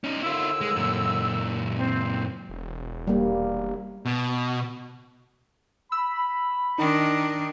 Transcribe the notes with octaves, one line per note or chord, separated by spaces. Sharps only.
C#4 D#4
D#2 D3 E4 F4 E6
G#3
F#2 A#2
C4
E1
G3 A#3
B2
B5 E6
D#3 D4 D#4